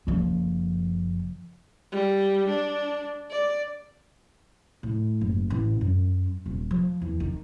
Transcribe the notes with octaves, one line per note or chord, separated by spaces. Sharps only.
F#1 F3
G3
D4
D5
A2
F#1
A1
F#2
D#1
F3
E2
D#3